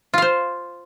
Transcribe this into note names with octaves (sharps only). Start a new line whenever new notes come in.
F4 C5 F5